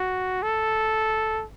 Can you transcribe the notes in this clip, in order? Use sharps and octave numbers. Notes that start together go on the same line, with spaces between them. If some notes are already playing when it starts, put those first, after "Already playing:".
Already playing: F#4
A4